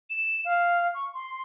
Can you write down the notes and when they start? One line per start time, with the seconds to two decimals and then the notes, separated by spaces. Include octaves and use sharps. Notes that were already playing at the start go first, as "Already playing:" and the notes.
0.10 E7
0.45 F5
0.94 C#6
1.14 C6